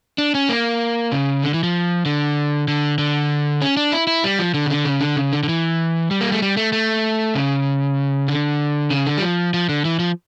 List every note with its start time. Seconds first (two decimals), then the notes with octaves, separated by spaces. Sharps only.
0.18 D4
0.35 C#4
0.49 A#3
1.12 C#3
1.44 D3
1.54 E3
1.63 F3
2.06 D3
2.68 D3
2.98 D3
3.62 C#4
3.77 D4
3.92 E4
4.07 E4
4.24 G3
4.39 F3
4.54 D3
4.66 C#3
4.70 D3
4.85 C#3
5.01 D3
5.17 C#3
5.33 D3
5.43 D3
5.49 E3
6.11 G3
6.21 A#3
6.32 A3
6.42 G3
6.57 A3
6.73 A3
7.35 C#3
8.28 D3
8.91 C#3
9.07 D3
9.18 G3
9.22 F3
9.54 F3
9.69 D3
9.85 E3
9.99 F3